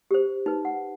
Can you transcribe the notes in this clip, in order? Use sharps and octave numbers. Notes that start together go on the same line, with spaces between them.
G4 C5
D#4 B4
F#5